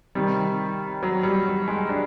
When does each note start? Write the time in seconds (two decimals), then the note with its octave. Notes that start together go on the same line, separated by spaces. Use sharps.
0.15 C3 D#3 G3
1.03 F#3
1.23 G3
1.46 F#3
1.68 G#3
1.89 D4